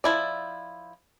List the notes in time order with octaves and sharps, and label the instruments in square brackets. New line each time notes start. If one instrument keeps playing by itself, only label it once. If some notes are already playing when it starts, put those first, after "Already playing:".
[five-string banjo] F3 D4 E4 D5